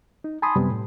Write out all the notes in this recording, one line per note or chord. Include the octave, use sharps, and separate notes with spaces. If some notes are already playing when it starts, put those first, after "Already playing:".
D#4
G#5 A5 B5 C6 D#6
F#2 C3 G3 B3
A2